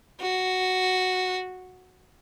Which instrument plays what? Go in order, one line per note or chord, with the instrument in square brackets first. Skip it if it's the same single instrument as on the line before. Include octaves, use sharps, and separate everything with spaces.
[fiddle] F#4